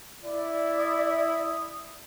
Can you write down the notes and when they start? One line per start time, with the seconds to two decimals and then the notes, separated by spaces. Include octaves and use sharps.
0.24 E4 D5
0.78 D#6